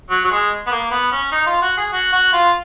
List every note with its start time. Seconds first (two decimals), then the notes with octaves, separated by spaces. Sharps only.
0.10 F#3
0.25 F#3
0.31 G#3
0.67 B3
0.72 A#3
0.91 B3
1.12 C#4
1.32 D#4
1.46 F4
1.62 F#4
1.77 G#4
1.92 F#4
2.12 F#4
2.33 F4